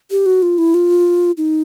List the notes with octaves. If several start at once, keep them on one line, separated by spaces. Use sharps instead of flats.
G4
F#4
F4
E4
F4
D#4